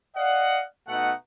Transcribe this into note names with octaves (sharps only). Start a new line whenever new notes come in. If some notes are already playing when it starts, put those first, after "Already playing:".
D5 D#5 F5 F#5
B2 A3 D#4 F#5